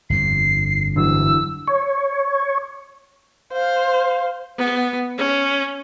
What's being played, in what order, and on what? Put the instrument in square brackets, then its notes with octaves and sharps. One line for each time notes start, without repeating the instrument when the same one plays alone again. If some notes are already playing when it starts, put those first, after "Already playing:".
[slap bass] G1 F2 [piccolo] C7
[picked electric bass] D3 E3 F#3 [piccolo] E6
[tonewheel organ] C#5
[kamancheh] C5 [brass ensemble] F5
[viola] B3
C#4